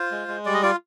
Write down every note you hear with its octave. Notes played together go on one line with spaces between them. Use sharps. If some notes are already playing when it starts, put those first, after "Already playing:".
Already playing: F4 C5
G#3
G#3
G3 D5
D#5
F4 D5